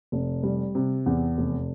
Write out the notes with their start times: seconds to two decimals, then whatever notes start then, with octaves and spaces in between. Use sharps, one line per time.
0.12 F1
0.43 G3
0.75 C3
1.06 E2
1.37 F1